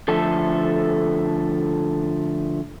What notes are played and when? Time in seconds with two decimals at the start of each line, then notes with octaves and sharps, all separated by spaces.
0.08 D3 F3 A3 A4